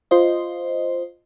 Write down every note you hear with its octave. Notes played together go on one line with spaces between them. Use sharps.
F4 C5 D#5